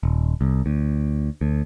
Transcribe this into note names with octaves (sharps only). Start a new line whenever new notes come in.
D#1
C2
D2
D2